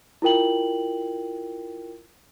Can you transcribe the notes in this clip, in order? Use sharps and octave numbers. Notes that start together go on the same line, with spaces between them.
E4 F4 A#4 G5 F#7